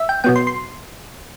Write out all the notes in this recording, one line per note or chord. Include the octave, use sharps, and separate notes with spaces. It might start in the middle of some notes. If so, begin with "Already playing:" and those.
Already playing: E5
G5
B2 F#3 B3 G5
C6
C6